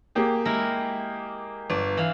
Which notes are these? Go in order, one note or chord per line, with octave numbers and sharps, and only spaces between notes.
A#3 G4 G#4
G#3 E4 A#4
G1 D5
E3 F5